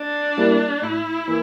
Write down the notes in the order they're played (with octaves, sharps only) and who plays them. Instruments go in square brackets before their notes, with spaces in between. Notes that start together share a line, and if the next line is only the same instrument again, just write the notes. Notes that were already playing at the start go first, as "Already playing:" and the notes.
Already playing: [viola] D4
[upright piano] G3 A#3 E4
[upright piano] A2 [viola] E4
[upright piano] E3 A#3